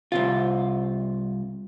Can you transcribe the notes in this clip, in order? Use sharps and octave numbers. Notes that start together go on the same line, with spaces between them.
C2 C3 F4